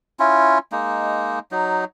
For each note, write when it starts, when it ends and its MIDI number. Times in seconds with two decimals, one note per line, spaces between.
0.19 0.58 61
0.19 0.58 64
0.19 0.58 65
0.72 1.39 56
0.72 1.39 58
0.72 1.39 63
1.51 1.85 54
1.51 1.85 63